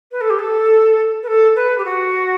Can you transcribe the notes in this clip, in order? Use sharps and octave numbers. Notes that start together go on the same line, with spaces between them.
B4
A4
G4
A4
B4
A4
B4
G4
F#4